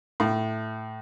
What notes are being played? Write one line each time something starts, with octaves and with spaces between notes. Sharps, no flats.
A2